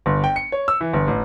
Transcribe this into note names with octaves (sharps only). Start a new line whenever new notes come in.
G1
G5
C#7
C#5
E6
E3
G1
A1